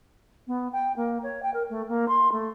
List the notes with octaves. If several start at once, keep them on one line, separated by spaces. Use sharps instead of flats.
B3
G5
A#3
C#5
G5
A#4
A3
A#3
C6
A3